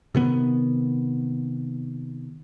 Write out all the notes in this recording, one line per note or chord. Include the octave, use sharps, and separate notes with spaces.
C3 D#3 B3